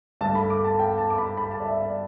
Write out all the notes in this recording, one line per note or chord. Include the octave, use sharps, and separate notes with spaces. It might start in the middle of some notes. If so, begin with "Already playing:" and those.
G2 D3 A3 A5
B5
D6
A5
G5
A5
D6
B5
B5
A5
D5
E5
D5